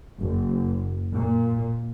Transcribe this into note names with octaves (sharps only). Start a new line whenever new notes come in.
F#1
A#2